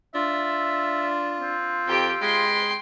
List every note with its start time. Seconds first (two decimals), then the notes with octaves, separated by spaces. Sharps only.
0.15 D4 F4 E5
1.40 C4
1.88 F2 G4 G5
2.22 G#3 G5 B5 C6